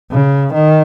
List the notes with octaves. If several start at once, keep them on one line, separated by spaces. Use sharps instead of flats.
C#3
D#3